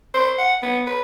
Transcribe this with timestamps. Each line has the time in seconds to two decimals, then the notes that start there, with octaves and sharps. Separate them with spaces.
0.14 C5
0.38 F#5
0.62 B3
0.86 B4